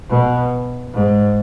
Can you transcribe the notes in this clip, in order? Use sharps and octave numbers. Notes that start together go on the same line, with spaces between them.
B2
G#2